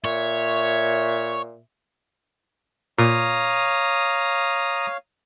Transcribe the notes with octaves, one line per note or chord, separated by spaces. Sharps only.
A#2 C#5 E5
A#2 C#5 F5 A#5 D#6